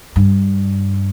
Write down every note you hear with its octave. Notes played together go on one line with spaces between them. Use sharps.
G2